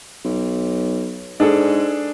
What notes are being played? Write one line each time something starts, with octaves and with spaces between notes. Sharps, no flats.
B1
G#2 D4 G#4 A4